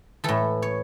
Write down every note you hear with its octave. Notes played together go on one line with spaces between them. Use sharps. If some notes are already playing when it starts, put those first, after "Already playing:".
A2 E3 A4
C#5